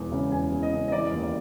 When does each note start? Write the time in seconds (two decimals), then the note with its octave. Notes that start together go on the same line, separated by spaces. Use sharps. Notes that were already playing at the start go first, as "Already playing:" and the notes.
Already playing: E1 E2
0.12 C#3
0.32 E2 G#5
0.52 E2
0.62 D#5
0.72 C#3
0.88 D#5
0.92 E3 D5
1.12 D#2
1.23 D5